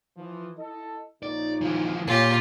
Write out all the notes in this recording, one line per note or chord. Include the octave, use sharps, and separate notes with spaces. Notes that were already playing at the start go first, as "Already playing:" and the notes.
E3 F3
E4 A4 D#5
A#1 C#3 D#4 D5
E3 F3
A#2 F4 G4 G#4 C#5